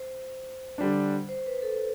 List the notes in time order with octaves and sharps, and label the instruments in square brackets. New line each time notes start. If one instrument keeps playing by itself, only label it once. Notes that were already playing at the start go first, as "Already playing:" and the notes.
Already playing: [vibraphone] C5
[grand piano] D3 G3 D4
[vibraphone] C5
B4
A4